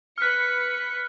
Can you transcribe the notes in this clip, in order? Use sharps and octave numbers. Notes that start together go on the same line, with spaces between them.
B4 F6 F#6 B6 C#7